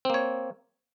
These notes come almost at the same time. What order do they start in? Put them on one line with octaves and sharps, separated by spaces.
C4 A#3 C#5